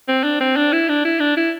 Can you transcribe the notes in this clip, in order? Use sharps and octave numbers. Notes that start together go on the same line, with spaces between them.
C4
D4
C4
D4
E4
D4
E4
D4
E4